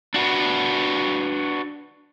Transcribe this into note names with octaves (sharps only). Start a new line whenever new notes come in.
D4 F#4 B4